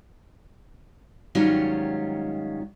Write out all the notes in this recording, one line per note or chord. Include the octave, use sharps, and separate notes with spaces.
G#2 D#3 F#3 G3 C#4 F4